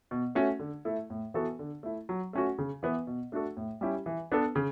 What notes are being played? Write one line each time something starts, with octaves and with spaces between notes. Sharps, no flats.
B2
A3 C#4 F#4
D3
A3 E4 A4
A2
E3 B3 F#4 A4
D3
A3 E4
F#3
A3 C#4 F#4
C#3
E3 B3
B2
A3 D4 F#4 A4
A2
G3 C#4 E4 G4
E3
B3 D4 A4
C#3